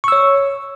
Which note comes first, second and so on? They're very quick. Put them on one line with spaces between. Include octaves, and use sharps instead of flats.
C#6 E6 C#5